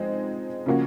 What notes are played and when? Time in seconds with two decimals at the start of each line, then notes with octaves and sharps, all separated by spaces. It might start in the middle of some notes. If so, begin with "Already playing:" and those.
Already playing: F3 G#3 C4 D#4
0.66 C#3 F3 A#3 C#4 F#4